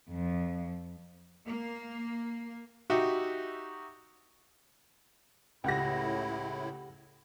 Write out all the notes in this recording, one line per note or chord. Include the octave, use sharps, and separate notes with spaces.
F2 F3
A#3
D#4 F#4 G4 E5
C#2 A2 E4 G4 F#5 G5 A#6